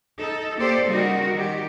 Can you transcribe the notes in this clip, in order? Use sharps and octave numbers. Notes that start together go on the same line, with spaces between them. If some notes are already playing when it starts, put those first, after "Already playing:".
D#4 A4
A#3 G4 A4 C5 D5
C#3 G3 D#4 F#4 A#4
D#3 G4